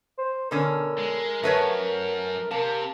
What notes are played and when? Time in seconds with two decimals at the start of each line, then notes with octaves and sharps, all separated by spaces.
0.18 C5
0.51 B2 D3 C#4 A#4
0.98 G#3
1.44 F#2 A3 B4 C#5
2.51 C3 A#3 A5